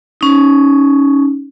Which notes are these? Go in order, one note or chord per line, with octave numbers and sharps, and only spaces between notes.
C#4 D#4